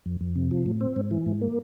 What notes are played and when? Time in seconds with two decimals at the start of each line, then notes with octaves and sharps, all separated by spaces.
0.06 F2
0.21 F2
0.36 C3
0.51 F3
0.66 A2
0.81 C4
0.96 G#2
1.11 E3
1.26 G#2
1.41 A#3